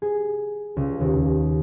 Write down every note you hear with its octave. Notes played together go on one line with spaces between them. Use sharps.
G#4
C#2
D#2